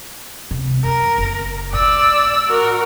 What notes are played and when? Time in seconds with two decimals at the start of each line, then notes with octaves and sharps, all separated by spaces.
0.51 C3
0.84 F#2 A#4
1.18 F#1
1.73 A2 D5 E6
2.50 F#4 A#4